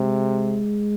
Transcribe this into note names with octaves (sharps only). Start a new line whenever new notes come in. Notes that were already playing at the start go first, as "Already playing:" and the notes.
Already playing: C3 G#3